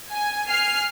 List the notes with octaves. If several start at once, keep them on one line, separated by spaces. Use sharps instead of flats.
G#5
G#5 F6 C7